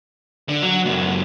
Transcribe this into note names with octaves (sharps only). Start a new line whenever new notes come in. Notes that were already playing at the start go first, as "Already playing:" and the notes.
D3
F#3
C#2 F#2